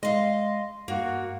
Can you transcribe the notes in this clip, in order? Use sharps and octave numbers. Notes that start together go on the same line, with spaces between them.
G#3 D#5 F5 C6
G2 A#3 F#4